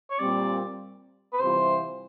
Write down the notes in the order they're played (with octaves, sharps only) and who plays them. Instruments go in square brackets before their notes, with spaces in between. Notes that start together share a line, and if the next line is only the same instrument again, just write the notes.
[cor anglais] C#5
[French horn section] A#2 G3 C4 [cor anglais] D5
[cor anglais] B4
[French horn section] C3 E3 G3 C4 F4 [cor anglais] C5